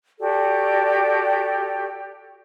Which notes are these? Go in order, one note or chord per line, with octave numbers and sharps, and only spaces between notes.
F#4 G4 A4 D5